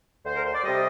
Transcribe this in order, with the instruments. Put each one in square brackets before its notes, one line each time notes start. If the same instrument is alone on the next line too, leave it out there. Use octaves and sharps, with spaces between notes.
[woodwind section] D2 C5
A#4
C5
D5
C3 G3 D#5